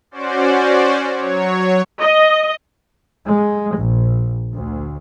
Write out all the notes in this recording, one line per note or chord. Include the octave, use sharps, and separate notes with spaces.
C#4 F#4 C5 D5
F#3 C#5
D#5
G#3
A#1
D2